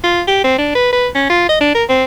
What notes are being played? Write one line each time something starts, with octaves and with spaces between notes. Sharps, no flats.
F4
G4
C4
D4
B4
B4
C#4
F4
D#5
D4
A#4
C4